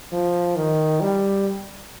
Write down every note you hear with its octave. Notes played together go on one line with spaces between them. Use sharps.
F3
D#3
G3